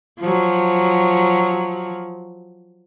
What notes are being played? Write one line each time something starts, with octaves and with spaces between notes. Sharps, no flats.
F3 F#3